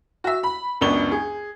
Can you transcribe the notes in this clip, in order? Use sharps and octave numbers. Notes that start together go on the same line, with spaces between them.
F#4 E5
B5
C#2 F#2 B3 D4 C#6 G7
G#4